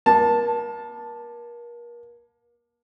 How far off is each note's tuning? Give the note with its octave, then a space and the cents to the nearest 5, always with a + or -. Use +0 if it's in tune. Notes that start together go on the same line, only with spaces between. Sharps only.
A#3 +35 A5 +0